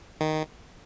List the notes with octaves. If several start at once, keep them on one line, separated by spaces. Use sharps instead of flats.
D#3